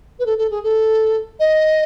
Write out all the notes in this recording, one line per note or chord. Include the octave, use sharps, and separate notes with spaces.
B4
A4
A4
G#4
A4
D#5